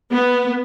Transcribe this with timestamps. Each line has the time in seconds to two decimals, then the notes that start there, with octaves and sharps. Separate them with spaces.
0.12 B3